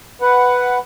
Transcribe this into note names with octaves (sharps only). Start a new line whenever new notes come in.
B4 F#5